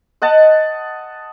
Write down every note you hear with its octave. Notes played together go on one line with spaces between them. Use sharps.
D#5 F#5 A5